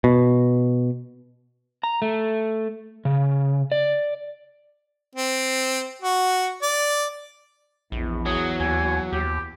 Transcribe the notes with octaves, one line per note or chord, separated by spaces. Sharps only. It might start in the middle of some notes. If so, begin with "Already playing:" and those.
B2
A#5
A3
C#3
D5
C4
F#4
D5
A#1 E2
F#3 G#4
D#2 G#5
D#2 G4